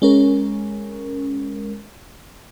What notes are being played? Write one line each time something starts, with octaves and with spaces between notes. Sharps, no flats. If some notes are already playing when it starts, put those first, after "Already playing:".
G#3 C#4 A#4